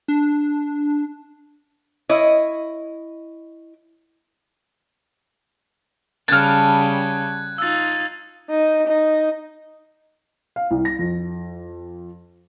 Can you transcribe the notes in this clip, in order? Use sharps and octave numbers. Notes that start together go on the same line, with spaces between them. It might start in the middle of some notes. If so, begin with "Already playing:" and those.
D4
E4 C#5 D#5
C#3 G3 A5 F6 F#6 G#6
D#4 F4 E6 A6
D#4
D#4
F5
C2
A#6
F2